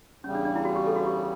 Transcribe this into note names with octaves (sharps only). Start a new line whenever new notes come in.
E2 C#3 G3 C#4
D4
D4
E4
F#4
G4
A4
F#4
G4